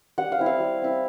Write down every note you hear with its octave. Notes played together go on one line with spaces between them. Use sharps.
G3 F#5
F5
C4 E4
F5
G3
C4 E4